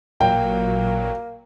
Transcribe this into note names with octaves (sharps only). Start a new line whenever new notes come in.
A1 A#2 F#3 A#3 G5